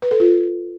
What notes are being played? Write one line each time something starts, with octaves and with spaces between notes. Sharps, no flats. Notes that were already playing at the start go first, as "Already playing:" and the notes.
B4
A4
F4